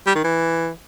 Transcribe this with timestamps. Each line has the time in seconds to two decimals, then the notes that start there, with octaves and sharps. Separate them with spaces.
0.07 G3
0.15 D#3
0.24 E3